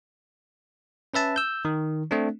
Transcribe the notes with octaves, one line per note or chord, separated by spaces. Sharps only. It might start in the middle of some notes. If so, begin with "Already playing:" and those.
C#4 B4 E5 A5
E6 G6
D#3
A3 C4 D4